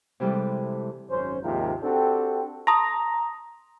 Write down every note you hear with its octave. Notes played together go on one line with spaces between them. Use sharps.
C3 E3 G3 G#3 A4
G#1 F#2 C#4 C5
D#2 G#2 C3 F3 F4 A#4
C4 D4 F#4 G4 A4
A5 A#5 C6 D#6